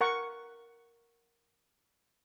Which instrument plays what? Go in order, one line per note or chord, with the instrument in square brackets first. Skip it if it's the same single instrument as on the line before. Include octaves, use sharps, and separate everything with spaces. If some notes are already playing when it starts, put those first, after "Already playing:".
[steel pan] A#4 F#5 C#6